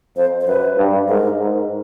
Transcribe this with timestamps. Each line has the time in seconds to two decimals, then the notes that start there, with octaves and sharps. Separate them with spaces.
0.17 F2 C5
0.41 C5
0.47 F#2 B4
0.78 G2
1.08 G#2 A#4
1.39 G#2